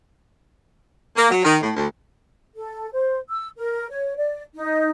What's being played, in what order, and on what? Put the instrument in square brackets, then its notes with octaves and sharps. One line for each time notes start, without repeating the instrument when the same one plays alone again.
[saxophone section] A#3
F#3
D#3
A2
D2
[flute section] A4
C5
E6
A#4
C#5
D5
D#4